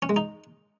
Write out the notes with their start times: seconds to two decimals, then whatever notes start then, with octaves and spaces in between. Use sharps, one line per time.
0.02 C#4
0.09 G#3
0.16 D#4